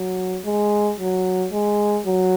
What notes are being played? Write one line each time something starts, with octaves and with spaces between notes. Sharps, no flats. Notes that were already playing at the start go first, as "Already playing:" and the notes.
Already playing: F#3
G#3
F#3
G#3
F#3